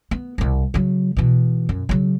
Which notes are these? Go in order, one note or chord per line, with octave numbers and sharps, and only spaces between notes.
B3
C2 C3
C#3 F#3
B2 E3
F#2
C#3 F#3